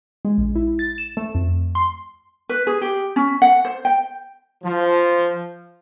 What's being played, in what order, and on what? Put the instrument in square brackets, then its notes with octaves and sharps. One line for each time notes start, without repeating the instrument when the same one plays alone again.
[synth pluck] G#3
A#1
E4
A6
E7
A3
F2
C6
[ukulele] B4
G#4
G4
C#4
F#5
C5
G5
[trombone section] F3